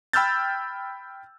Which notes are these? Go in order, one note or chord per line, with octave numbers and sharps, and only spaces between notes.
G5 B5 E6 F6 G6 A6